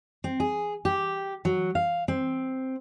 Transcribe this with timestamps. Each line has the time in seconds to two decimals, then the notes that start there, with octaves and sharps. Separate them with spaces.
0.24 C4
0.40 G#4
0.85 G4
1.45 F#3
1.75 F5
2.08 C4